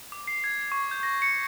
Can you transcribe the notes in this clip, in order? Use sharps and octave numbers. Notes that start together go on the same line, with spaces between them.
D6
C7
G#6
C7
C#6
G6
A#6
C#7